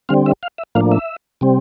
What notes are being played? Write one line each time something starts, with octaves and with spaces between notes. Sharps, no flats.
D3 G3 C4 F5
E5
F5
E5
A2 F3 A#3 D4 F5
E5
C3 G3 C4